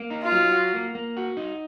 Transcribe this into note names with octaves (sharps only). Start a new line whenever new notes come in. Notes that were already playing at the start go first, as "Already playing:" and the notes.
Already playing: A#3
D#4
F4
F#3
F#4
A#3
A#3
F#4
D#4